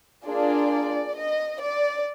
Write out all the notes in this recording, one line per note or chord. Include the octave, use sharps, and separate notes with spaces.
A#3 D4 F4 G#4 D5
D#5
D5